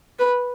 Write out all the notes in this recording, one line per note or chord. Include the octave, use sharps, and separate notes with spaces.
B4